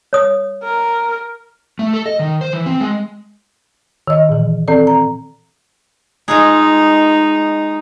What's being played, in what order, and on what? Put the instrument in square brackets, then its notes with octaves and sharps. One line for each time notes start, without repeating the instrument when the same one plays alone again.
[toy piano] C#5 D#6
[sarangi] A#4
[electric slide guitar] A3
A4
D#5
D#3
C5
E3
C4
G#3
[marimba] D#3 D#5
A#2 E3
C4 A4 D5
A#5
[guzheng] G#3 F4 G#4 [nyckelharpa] D#4